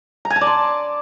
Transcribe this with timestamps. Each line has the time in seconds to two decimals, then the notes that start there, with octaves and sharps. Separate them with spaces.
0.25 A#5
0.30 G#5
0.36 A5
0.41 D5
0.47 C6